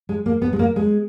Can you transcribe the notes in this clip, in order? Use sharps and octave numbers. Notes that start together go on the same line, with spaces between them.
G#3
A#3
B3
G#3
A#3
G#3